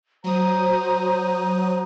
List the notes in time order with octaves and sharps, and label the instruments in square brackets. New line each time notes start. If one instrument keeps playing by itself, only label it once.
[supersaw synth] F#3 D#6 [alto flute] C5 [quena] A#5